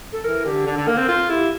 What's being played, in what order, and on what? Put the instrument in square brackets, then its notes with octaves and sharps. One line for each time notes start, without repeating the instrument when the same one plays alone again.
[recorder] A4
[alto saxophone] E3 [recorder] A#4
[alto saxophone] D3 [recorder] G4
[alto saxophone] D3 [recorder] A4
[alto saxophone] D3
[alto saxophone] A#3 [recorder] A#4
[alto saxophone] C4
[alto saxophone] F4 [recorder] A4
[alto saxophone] E4 [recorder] G4